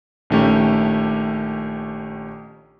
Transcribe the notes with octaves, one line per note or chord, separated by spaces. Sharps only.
A#1 D#3 A3 C#4 G4